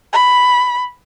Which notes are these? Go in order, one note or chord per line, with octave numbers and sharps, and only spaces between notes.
B5